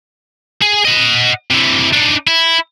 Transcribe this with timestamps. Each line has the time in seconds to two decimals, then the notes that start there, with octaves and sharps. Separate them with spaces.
0.61 G#4
0.85 D#5 F#5
1.50 C3 E3
1.93 D4 D#4
2.27 E4